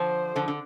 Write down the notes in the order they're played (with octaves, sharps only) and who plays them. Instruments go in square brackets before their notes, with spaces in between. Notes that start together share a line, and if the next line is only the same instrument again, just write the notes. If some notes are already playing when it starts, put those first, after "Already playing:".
Already playing: [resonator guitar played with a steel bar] D3 F3 [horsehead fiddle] C5
[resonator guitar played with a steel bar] D3 F3
D3